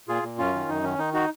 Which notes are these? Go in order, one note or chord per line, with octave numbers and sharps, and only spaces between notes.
A#2 F4 G#4
A#2
F#2 C#4 F4
D#3
F#2 D#4
D#3 C#4
D#3 D#4
D#4 F#4